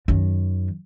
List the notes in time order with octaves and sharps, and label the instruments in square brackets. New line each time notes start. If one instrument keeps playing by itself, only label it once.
[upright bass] F#2 D#3